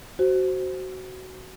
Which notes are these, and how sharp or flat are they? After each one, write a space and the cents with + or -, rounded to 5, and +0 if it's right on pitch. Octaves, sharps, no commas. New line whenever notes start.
F#4 +15 C5 +0